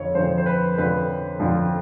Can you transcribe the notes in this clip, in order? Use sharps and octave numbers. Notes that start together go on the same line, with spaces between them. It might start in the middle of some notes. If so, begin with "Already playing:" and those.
Already playing: F2 D3 F3 C#5
F2 D3 F3 C5
C5
B4
F2 D3 F3 B4
F2 D3 F3